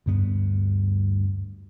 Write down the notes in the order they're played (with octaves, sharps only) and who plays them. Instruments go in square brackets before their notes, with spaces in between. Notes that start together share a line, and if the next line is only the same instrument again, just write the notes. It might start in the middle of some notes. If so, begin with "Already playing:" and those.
[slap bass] D2 G2 B3